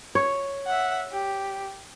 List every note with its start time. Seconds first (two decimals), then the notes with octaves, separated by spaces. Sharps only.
0.15 C#5
0.66 E5 F#5
1.12 G4